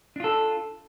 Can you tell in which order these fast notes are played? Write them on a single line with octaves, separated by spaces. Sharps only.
D4 F4 A4